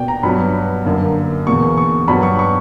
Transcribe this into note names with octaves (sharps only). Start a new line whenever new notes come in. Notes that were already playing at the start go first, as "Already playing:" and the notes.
Already playing: B2 A#3 D5 G5
A#5
G2 F#3 B3 B5
F#2 D3 A#3
E2 B2 A#3 C#6
C#6
G2 F#3 B3 B5
C#6
C#6